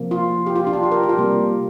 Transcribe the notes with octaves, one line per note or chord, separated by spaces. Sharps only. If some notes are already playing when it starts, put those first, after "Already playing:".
Already playing: C3 F3 A#3
F4
G4
F4
D4
F4
G4
A#4
G4
F4
C3 G3 A#3